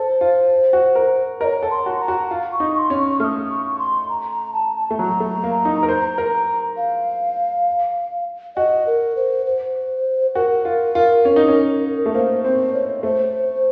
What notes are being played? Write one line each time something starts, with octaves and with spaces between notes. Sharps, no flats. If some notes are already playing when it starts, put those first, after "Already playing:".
Already playing: A4 C5
F4
F#4
A#4
A#4 C#5 D#5
A4
C6
F#4
A#5
F#4
F4
C#6
D#4
C#6
C6
C#4
C#6
A3 D#6 F6
C#6
C6
A#5
A#5
A5
A5
A3
F#3 A#5
A3
A#3
D#4
A#4
C5
A#4
F5
F#4 D#5
A#4
C5
C5
F#4 A#4
F4
F4
C#4
D#4
C#4
A3
A#3 C5
C4 C5
C#5
A3 C5